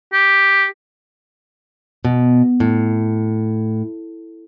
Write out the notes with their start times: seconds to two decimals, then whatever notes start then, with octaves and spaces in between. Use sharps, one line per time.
0.13 G4
2.05 B2
2.60 A2